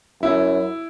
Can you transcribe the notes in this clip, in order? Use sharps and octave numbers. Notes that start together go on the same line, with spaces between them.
F#2 E4